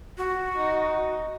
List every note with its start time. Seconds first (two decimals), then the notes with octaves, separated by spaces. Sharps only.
0.18 F#4
0.56 D#4